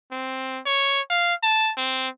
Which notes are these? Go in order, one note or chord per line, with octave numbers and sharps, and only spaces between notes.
C4
C#5
F5
A5
C4